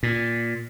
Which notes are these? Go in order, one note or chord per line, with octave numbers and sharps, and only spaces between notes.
A#2